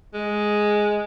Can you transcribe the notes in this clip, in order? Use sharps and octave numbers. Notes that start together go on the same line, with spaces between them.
G#3